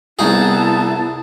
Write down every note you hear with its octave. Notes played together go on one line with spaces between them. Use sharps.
C2 B3 D#4 E4 G#4 A5